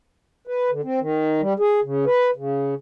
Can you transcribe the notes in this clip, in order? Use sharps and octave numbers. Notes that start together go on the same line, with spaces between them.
B4
D3
C4
D#3
G3
G#4
C#3
B4
C#3